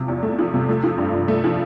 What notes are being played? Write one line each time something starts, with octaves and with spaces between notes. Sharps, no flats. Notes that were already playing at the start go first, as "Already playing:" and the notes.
Already playing: C3 F3
E2
A3
F3
C3
A3
F3
G2
G2
A3
F3